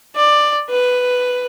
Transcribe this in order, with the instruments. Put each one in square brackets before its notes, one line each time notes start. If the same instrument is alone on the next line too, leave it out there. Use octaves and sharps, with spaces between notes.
[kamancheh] D5
B4